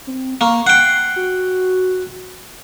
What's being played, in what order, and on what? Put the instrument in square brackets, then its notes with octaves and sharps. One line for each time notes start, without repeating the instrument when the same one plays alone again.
[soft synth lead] C4
[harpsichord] A#3 [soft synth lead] C#6
[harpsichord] F#5 G5 [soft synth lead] C7
[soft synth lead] F#4